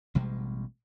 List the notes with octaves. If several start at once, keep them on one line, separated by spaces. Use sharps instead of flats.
A1 B2 G3 G#3